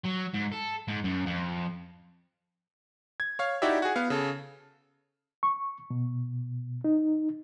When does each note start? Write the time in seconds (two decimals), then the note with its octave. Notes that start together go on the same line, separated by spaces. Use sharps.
0.05 F#3
0.34 G#2
0.52 A4
0.88 G#2
1.04 F#2
1.26 F2
3.20 G#6
3.39 C#5 F5
3.62 D#4 E4 F#4 G4 D5 E5
3.82 F#4 G#4
3.96 B3 F5
4.10 C#3 A4
5.43 C#6
5.90 B2
6.84 D#4